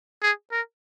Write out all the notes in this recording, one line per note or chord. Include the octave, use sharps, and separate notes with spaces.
G#4
A#4